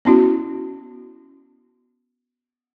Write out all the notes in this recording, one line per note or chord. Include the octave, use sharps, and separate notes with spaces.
B3 C#4 E4 F#4